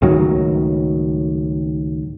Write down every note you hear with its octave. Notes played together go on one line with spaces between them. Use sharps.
C#2 A2 D#3 F#3